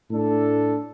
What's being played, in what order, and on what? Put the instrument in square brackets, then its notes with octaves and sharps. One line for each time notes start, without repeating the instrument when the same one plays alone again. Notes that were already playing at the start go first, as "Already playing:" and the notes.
[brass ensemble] A2 A3 D4 A4